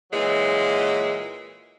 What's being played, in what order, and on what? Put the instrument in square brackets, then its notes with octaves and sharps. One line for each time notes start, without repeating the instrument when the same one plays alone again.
[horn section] A#2 E3 F#3 G#3